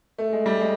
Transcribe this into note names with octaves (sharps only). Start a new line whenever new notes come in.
A3
G#3
G3
G#3